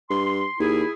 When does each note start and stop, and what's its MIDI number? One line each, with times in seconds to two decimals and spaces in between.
0.10 0.44 43
0.10 0.53 84
0.59 0.84 39
0.59 0.93 64
0.59 0.93 68